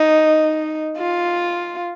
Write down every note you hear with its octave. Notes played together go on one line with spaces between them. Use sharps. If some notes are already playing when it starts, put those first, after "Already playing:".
Already playing: D#4
F4